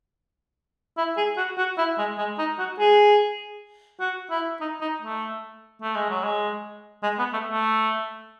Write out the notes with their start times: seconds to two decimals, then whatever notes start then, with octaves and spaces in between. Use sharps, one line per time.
0.98 E4
1.17 G#4
1.37 F#4
1.58 F#4
1.78 E4
1.98 G#3
2.18 G#3
2.38 D#4
2.59 F#4
2.79 G#4
4.00 F#4
4.30 E4
4.61 D#4
4.81 D#4
5.02 A3
5.82 A3
5.96 G#3
6.10 F#3
6.23 G#3
7.03 G#3
7.19 B3
7.33 A3
7.49 A3